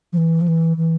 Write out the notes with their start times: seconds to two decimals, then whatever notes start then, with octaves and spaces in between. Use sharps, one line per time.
0.13 F3
0.18 E3
0.41 F3
0.48 E3
0.77 E3